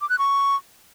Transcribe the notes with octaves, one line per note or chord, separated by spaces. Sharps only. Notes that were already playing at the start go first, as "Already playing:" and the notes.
D6
F#6
C#6